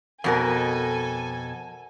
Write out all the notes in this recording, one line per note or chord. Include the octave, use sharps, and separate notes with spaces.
F2 B2 A4 A#4 G#5